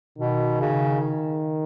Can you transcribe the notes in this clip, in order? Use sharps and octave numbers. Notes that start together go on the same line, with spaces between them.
B2 D#3
C#3